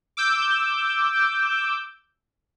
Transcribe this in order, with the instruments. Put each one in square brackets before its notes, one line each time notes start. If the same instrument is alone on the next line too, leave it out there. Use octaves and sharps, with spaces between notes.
[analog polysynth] D6 E6 G6